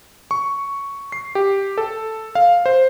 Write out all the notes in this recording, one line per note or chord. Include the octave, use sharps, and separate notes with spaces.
C#6
C7
G4
A4
F5
C5